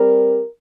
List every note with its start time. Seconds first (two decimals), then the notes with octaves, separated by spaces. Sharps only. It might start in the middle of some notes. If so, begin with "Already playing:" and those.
Already playing: G3 C4 G4 A#4